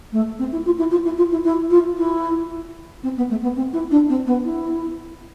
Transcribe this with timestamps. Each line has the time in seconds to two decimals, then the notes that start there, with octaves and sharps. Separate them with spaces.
0.12 A3
0.39 C4
0.52 E4
0.65 F4
0.78 E4
0.91 F4
1.04 E4
1.17 F4
1.31 E4
1.44 E4
1.70 F4
1.97 E4
3.03 C4
3.17 B3
3.30 A3
3.42 B3
3.56 C4
3.73 E4
3.91 D4
4.09 C4
4.26 B3
4.44 E4